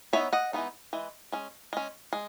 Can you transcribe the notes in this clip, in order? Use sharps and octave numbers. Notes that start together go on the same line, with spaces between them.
E3 B3 D#4 C#5 E5
D#5 F#5
E3 G#3 B3 D#4
E3 G#3
G#3 C#4
G#3 C#4
G#3